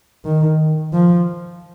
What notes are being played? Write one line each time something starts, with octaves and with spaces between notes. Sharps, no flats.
D#3
F3